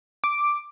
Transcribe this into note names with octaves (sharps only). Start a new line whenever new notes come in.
D6